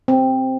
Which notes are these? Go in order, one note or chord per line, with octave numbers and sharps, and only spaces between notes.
C4